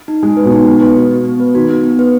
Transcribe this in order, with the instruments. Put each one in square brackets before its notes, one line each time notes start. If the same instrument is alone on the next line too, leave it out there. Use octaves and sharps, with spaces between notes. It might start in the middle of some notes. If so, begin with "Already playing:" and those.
[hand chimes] D#4
[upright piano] G#3 [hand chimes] G#5
[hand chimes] B4
[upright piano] B2
[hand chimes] D#4
B3
B4
F#4
B3
B3
B4
[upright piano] D#3 [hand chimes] F#4
[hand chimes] B3
B3
B4